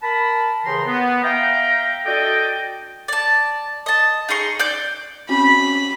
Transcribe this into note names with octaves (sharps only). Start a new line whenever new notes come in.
A#4 A5 B5
D#2 C#3 E3 G5 A#5 C6
B3
E5 F5 G5 A#5
D4 F#4 A4 D5 D#5 G5
D5 A5
D#5 A5
D#4 G#4 C6 C#6
D5 D6 G6
C4 C#4 F#4 B5